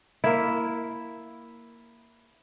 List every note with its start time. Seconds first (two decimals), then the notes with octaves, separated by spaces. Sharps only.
0.24 A#3 E4